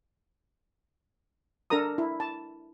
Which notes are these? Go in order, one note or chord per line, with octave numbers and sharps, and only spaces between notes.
D4 A4 A#4 A#5 D#6
E4
A5